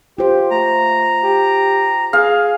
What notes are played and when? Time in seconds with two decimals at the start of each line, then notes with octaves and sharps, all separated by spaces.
0.18 F4 G4 C5
0.51 A3 A#5
1.23 G4
2.13 G#4 F5